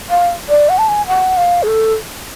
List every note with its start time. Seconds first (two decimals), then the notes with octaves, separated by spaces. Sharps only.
0.10 F5
0.49 D5
0.69 F#5
0.78 A5
0.88 G#5
1.08 F#5
1.37 F5
1.63 G#4
1.67 A4